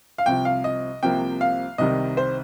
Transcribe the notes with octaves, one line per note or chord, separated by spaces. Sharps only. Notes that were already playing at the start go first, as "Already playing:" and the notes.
F5
C2 C3 F3 G5
F5
D#5
C2 C3 F3 A#3 G5
F5
C2 C3 D#3 G3 D#5
C5